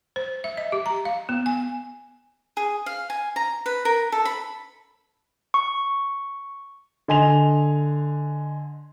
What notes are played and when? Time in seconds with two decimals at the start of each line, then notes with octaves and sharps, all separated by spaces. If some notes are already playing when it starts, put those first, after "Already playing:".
0.16 C5
0.44 E5
0.57 D#5
0.72 G4
0.86 A#5
1.05 F5
1.29 B3
1.46 G#5
2.57 G#4
2.86 F5
3.10 G#5
3.36 A#5
3.66 B4
3.85 A#4
4.12 A4
4.25 B5
5.54 C#6
7.08 D3 D#5 G#5 C6 F7